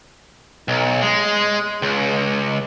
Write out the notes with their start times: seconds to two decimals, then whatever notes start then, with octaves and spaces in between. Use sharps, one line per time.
0.68 B1
1.02 G#3
1.82 C#2